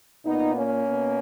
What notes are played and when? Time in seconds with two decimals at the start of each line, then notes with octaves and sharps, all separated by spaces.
0.24 A#2 B3 D#4
0.54 A#3 C#4
0.83 B2